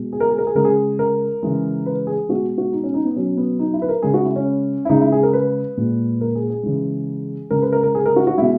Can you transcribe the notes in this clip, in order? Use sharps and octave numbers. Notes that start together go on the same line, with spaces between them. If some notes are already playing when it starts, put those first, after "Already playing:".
Already playing: B2 G#3
G#4
A#4
G#4
A#4
G#4
C#3 G#3 A#4
G#4
A#4
C#3 E3 G#3
B4
G#4
B2 G#3 F#4
F#4
D#4
C#4
D#4
B3
B2 F#3 C#4
B3
D#4
E4
B4
A#4
C#3 G#3 G#4
F#4
E4
C#4
E4
C#3 G#3 D#4
E4
G#4
A#4
B4
A#2 G#3
A#4
G#4
G#4
C#3 E3 G#3
C#3 G#3 A#4
B4
A#4
A#4
G#4
A#4
F#4
F#4
B2 G#3 E4